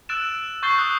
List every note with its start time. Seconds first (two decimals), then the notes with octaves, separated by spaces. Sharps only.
0.09 E6 F#6 A6 D7 E7
0.63 C#6 G6 A6 C7 G7
0.78 D#6 F#6